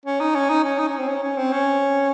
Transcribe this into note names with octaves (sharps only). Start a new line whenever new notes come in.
C#4
D#4
C#4
D#4
C#4
D#4
C#4
C4
C#4
C#4
C4
C#4